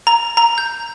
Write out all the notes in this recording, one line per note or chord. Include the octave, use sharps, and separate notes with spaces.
A#5
A#5
G6